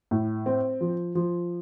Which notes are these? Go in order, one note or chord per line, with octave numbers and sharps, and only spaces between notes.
A2
C4
F3
F3